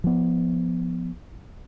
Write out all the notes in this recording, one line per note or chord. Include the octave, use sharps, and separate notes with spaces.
F3 B3